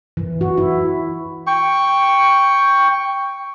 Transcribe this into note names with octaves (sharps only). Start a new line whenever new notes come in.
E3
F#4
E4
G5 C#6